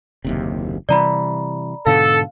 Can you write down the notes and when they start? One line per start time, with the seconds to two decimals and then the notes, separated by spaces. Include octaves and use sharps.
0.24 F#1 D#2 C3
0.89 C3 E3 G3 D5 A#5 B5
1.86 G#2 B2 D3 A4 F5